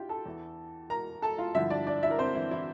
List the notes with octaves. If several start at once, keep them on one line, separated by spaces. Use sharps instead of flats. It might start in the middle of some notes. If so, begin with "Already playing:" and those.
Already playing: E3 D4 E4 F4 G4 G5
A4 A5
E2 E3
A#4 A#5
A4 A5
F4 F5
G2 D3 F3 E4 E5
D4 D5
D4 D5
E4 E5
A#4
C4 C5
E3 E4
E3 E4